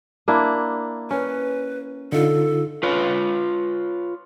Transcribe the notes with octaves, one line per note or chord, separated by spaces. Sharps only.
A#3 D4 E4
C#4 B4
D3 D#4 F4 A4
F4 B4 C#5